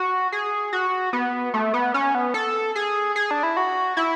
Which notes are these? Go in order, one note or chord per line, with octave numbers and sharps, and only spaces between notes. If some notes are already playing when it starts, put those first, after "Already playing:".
Already playing: F#4
G#4
F#4
B3
A3
B3
C#4
B3
A4
G#4
G#4
D4
E4
F#4
E4